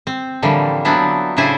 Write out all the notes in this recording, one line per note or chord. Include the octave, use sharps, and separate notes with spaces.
C4
A2 D3 E3 F3 G3 A#3
F3 F#3 B3 C4 D4 E4
A2 C#3 D4 E4 C5 G#5